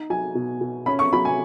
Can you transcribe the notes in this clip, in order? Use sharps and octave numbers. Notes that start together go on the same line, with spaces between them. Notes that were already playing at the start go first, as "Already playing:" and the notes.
Already playing: D#4
F#3 G#5
B2
B2
C#4 B5
C#6
F#3 B5
G#5